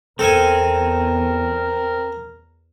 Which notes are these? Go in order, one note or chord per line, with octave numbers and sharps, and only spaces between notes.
E2 C4 A4 A#4 G#5